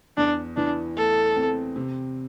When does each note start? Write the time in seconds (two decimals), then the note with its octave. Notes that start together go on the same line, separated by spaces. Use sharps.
0.17 E2 D4
0.56 E3 D4
0.97 A3 A4
1.37 C4
1.76 C3